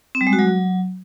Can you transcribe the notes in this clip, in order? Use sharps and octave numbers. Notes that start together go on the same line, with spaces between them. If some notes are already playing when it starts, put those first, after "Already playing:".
C4
G3
G#3
F#4
F#3